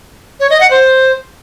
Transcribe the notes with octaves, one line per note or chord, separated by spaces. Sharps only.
C#5
D#5
F#5
C5